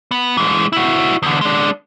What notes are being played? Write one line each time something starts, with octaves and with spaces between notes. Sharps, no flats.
B3
E3 G#3
E4 F#4
E2 D3
G#3 D4